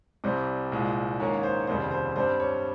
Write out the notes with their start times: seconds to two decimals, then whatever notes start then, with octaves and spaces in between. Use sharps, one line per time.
0.24 C2 C3 G3 C5
0.72 C2 A#2 G#3
1.20 G#2 D#3 A#3 C#4 C#5
1.43 C5
1.67 F1 D#2 C#3 G3 C4 C5
1.91 C5
2.16 G2 G3 C4 C5
2.40 C#5